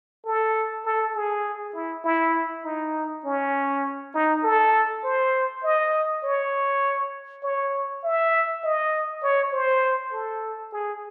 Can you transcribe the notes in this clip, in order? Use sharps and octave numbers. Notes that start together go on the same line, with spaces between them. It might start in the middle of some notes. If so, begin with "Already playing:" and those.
A4
A4
G#4
E4
E4
D#4
C#4
D#4
A4
C5
D#5
C#5
C#5
E5
D#5
C#5
C5
A4
G#4